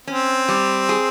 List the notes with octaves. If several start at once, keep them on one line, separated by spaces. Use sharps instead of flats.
C4 C#4
G3
G#4